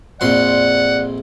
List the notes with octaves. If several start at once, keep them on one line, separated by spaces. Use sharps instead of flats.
A#1 F2 D5 F#5 C6